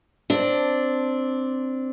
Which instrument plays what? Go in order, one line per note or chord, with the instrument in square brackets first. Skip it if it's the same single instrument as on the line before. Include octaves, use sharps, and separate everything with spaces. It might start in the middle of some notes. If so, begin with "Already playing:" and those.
[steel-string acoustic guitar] C4 D4